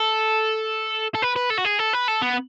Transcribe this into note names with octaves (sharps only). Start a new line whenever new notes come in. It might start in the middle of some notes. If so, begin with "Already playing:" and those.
Already playing: A4
A4
B4
B4
A4
F#4
G#4
A4
B4
A4
B3